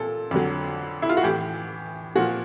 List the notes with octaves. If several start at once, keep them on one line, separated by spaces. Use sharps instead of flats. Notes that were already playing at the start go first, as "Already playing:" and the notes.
Already playing: A#2 A4
F2 D3 F#3
E4
F4
F#4
A2 E3 G4
A#2 F3 F#4